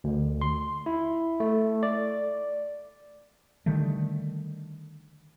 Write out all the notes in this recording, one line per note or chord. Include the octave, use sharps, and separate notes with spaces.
D2
C6
E4
A3
D5
D3 D#3 G3 A3